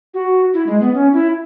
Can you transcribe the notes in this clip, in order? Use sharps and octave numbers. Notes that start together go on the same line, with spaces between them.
F#4
E4
G#3
B3
C#4
E4